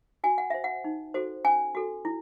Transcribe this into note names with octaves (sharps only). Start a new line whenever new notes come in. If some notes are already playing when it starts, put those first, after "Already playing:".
F#4 G#5
F#5
C5 E5
F#5
D#4
F#4 A4 C5
C#4 G#5
F#4 A4
E4